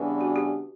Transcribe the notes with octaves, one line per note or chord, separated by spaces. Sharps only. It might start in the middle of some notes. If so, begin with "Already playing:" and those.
Already playing: C#3 E3 G3 B3 D4
F#4
G4